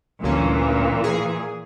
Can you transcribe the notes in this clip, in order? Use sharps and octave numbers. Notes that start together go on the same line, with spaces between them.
G1 D2 A#2 E3 C#4
G#4